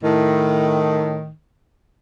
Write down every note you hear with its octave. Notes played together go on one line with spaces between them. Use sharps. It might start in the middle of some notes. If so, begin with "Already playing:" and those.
A2 D#3